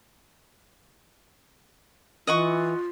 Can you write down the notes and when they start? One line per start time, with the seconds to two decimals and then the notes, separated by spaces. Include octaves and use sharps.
2.27 E3 F4 D#5 F#5 C#6